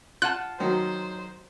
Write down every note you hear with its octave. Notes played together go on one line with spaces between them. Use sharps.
F4 F#5 A5 F#6
D#3 F#3 C5